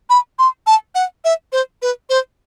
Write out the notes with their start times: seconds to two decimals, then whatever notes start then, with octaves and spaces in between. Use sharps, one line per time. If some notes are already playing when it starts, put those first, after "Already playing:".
0.10 B5
0.39 C6
0.67 A5
0.95 F#5
1.25 E5
1.52 C5
1.82 B4
2.10 C5